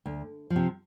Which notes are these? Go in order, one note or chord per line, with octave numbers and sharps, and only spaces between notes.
D2
F3
C3